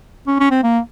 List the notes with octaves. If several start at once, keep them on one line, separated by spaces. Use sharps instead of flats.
C#4
C#4
C4
A#3